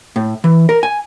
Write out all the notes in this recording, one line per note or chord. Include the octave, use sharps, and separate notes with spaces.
A2
E3
A#4
G#5